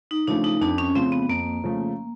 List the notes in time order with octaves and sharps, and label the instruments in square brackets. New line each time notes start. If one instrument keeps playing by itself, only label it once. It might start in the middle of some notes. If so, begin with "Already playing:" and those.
[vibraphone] D#4
[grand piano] C#3 F3 A3 [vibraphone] D4
[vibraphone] D#4
[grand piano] F2 [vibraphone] D4
[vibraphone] C#4
[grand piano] C#3 F3 A3 [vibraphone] C4
[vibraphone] B3
[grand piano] F2 [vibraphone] A#3
[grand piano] C#3 F3 A3